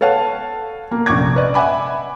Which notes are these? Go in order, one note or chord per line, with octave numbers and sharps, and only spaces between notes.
A4 B4 C#5 F5 F#5 A5
A#3
F1 A#1 F#2 C#6 D6 G#6
B4 D5 D#5
E5 F#5 G#5 B5 D6